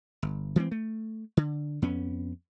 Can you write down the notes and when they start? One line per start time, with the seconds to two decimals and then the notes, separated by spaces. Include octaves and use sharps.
0.22 G1
0.56 E3 G#3 B3 C4
0.71 A3
1.37 D3
1.82 F2 B3 C#4